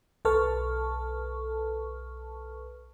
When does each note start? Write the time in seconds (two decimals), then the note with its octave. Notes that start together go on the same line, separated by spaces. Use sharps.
0.25 B1 A4 B4 A5 C#6 F6